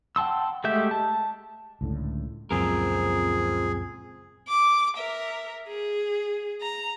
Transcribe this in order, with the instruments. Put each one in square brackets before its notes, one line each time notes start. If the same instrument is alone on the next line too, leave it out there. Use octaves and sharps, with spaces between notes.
[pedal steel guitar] F#5 G5 A5 C6 E6
G#3 A3 G4 E5 G6
A5
[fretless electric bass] C#2 A2 D3
[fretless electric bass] C#2 F#2 A#2 [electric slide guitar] F3 C4 A#4 [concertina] G#4
[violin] D6
A#4 E5
G#4
A#5